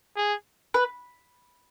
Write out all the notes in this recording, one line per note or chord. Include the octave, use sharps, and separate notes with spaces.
G#4
B4